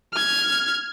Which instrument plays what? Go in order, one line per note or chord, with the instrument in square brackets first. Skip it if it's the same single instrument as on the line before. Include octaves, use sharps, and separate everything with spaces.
[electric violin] F6 G#6